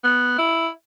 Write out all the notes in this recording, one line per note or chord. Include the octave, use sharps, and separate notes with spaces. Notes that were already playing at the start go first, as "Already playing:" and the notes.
B3
E4